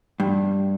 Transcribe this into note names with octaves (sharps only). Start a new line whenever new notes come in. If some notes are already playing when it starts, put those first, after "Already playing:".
G2